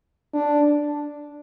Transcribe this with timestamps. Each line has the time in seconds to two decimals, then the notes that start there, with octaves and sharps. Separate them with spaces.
0.34 D4